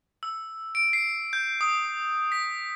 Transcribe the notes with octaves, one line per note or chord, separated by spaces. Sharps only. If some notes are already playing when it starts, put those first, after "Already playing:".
E6
D7
C7
G6
D#6
B6